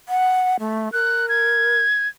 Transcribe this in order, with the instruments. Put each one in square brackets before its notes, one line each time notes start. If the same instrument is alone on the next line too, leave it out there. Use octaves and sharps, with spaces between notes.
[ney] F#5
A3
[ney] A#4 [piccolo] F#6
[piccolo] G#6